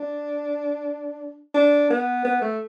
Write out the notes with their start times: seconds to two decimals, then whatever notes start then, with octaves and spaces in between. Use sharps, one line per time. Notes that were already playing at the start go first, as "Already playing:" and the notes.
Already playing: D4
1.54 D4
1.90 B3
2.25 B3
2.42 A3